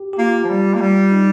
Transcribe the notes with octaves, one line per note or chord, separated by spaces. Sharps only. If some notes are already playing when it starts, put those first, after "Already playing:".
Already playing: G4
G4
A#3 F4
F3
G3
A#3
G3
D#4